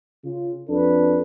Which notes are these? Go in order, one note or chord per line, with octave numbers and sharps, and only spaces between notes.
C#3 F4
F2 D4 A4 B4